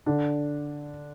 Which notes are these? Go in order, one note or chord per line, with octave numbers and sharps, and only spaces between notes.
D3 D4